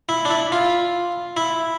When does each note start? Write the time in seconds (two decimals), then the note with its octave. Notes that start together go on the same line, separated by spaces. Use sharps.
0.09 E4
0.25 D4
0.30 E4
0.52 F4
1.37 E4